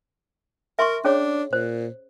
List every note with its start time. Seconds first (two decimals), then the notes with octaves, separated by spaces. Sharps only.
0.79 A#4 E5 C6 C#6
1.04 C#4 D4 G#4 C#5
1.53 A#2 C5